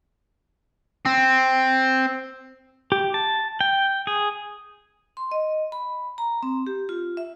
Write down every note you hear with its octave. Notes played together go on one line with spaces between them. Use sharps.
C4
G4
A5
G5
G#4
C6
D#5
B5
A#5
C4
G4
F4
E5